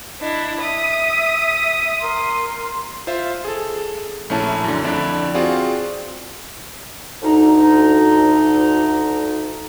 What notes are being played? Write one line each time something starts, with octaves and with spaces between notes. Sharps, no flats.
D4 E4 D#5
E5 D#6
A#4 C6
F4 C5 E5
G#4 A4
A#1 A3 C#4 E4 A5
F#2 D3
F2 D3 D4 E4 D5 B5
C4 F4 F#4 G#4 D5
D2 D#4